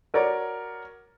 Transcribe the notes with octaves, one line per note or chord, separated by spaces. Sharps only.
F#4 A#4 C#5 D5